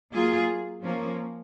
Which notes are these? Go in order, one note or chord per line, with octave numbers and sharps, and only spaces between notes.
F#3 A#3 F4 G#4
F3 A#3 C#4